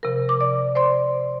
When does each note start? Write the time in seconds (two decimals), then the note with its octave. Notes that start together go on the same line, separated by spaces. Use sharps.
0.03 C3 F3 A#4
0.29 D6
0.41 D5
0.75 C5 D5 C6